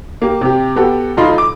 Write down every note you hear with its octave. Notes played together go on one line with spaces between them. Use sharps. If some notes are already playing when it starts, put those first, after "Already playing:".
A#3 G4
C3 G4
B3 F#4 G4 A4
D#1 D#4 F4 B5 C6
D6